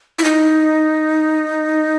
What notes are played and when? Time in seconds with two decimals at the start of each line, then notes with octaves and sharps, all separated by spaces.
0.19 E4
0.24 D#4